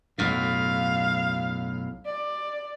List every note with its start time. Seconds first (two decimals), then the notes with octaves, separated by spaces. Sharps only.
0.18 B1 F#2 A2 F5
2.06 D5